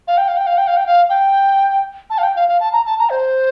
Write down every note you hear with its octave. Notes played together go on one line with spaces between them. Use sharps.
F5
G5
F5
G5
F5
G5
F5
G5
F5
G5
A5
F5
G5
F5
F5
A5
A#5
A5
A#5
C5